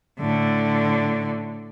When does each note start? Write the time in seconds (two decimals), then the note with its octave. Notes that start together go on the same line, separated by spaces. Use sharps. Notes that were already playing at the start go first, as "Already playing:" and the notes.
0.20 A2 D3